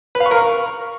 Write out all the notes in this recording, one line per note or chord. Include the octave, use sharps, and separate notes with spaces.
B4
F5
C#6
A#4
C#6